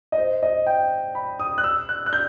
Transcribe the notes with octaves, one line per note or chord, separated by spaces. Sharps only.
D#5
C5
D#5
G5
B5
D#6
F#6
E6
F#6
F#6
G6